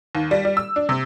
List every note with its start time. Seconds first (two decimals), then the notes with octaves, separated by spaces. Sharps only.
0.15 D#2
0.31 G3
0.45 G3
0.57 E6
0.76 D4
0.89 C3